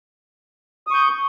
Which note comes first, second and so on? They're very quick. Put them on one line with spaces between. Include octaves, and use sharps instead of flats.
D#6 C#6 G6